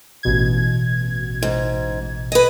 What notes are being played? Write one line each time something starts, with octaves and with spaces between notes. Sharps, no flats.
A1 B2 G#6
G#2
B4 D#5